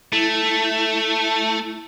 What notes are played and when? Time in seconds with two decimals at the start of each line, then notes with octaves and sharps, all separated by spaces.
0.13 A3 E4